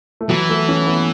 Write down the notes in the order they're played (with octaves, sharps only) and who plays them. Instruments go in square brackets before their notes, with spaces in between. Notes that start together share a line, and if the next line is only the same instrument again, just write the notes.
[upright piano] A3
[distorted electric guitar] E3 [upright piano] F#3
[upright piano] A3
C#4
B3